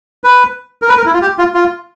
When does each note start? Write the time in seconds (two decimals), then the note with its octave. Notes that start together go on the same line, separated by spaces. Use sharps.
0.24 B4
0.82 A#4
0.89 B4
0.97 A#4
1.06 E4
1.13 F4
1.22 G4
1.38 F4
1.54 F4